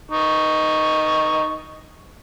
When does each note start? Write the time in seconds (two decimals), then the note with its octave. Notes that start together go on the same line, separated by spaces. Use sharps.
0.11 D#4 C#6